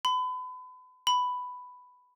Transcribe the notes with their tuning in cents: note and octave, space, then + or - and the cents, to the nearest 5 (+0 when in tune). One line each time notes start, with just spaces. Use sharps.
B5 +35
B5 +10